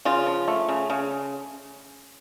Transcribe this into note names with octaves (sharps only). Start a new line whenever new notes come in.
C#3 F4
F3
A3
C#3
C#3